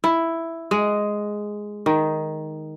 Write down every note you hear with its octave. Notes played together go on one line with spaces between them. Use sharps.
E4
G#3
D#3